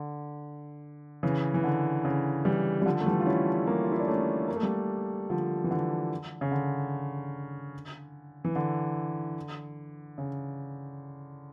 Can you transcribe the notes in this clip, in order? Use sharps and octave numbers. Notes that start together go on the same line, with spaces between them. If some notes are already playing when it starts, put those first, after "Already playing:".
Already playing: D3
C#3 E3
E3
D3
C#3
E3 G3
G3
D3 F3
A3
E3 G3
F4
C#4 E4
G3 A#3
F4
E4
D4
A3 C#4
A#3
A3
G3 A#3
D3 F3
E3
D3
C#3
D3
E3
D3
C#3